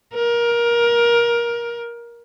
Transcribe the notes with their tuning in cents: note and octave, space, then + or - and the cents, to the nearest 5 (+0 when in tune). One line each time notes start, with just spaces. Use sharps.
A#4 +20